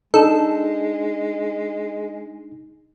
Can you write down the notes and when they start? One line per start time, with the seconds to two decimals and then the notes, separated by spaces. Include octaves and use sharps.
0.14 G#3 D4 D#4 A4